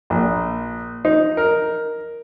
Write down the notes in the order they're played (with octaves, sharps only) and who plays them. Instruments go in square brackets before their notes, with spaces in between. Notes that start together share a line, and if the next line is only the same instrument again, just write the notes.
[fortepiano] A#1
D#4
A#4